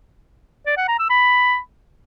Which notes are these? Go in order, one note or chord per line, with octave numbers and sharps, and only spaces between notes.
D5
F#5
A#5
E6
B5